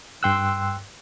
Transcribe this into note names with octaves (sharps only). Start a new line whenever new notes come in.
G2 G5 C6 E6 F#6